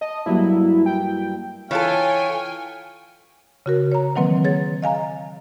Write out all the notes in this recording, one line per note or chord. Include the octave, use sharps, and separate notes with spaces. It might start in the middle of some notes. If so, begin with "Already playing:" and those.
D#5 A5
G2 F#3 A#3 E4
G5
E3 F4 A4 C#5 F5 G5 G#5
C#3 F#4 A#4
C#5 A#5
D#3 E3 F#3 A#3 C4 B4
G#4 C#5 A6
D#5 F5 G#5 A#5